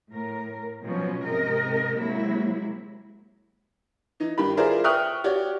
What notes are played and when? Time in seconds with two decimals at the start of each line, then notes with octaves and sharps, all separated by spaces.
0.10 A2 A#4
0.83 B2 F3 F#3 C#4
1.23 G#2 C3 A#4 D#5
1.97 C3 F#3 G#3 A#3 E4
4.20 E3 D#4
4.38 G2 D#3 G4 B5
4.57 E4 F4 G#4 A#4 C5 D5
4.84 E5 G5 C#6 D#6 F6 F#6
5.24 F#4 G4 C#5 D5